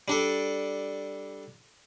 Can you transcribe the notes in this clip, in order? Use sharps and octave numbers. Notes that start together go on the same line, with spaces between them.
G3 D4 A4